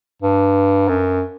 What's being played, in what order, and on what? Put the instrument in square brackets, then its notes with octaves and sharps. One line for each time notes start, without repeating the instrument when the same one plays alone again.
[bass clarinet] G2
F#2